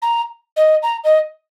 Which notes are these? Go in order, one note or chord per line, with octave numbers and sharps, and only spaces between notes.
A#5
D#5
A#5
D#5